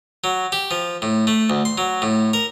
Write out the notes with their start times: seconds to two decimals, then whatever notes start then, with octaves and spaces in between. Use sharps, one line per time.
0.24 F#3
0.52 G4
0.71 F3
1.02 A2
1.27 A3
1.50 D2
1.65 C6
1.78 F#3
2.02 A2
2.33 A#4